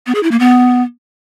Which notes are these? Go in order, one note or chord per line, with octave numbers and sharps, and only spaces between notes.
B3
G#4
E4
A#3
B3